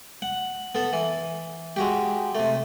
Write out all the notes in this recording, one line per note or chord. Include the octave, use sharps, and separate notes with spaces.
F#5
B3 A4
E3
G#3 F#4 G4
C3 A3